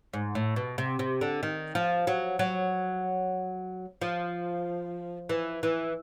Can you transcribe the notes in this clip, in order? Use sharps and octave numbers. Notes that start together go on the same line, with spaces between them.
G#2
A2
B2
C3
C3
D3
D#3
F3
F#3
F#3
F3
E3
E3